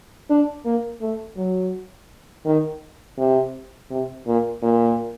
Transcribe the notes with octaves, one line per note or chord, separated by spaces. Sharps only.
D4
A#3
A3
F#3
D#3
C3
C3
A#2
A#2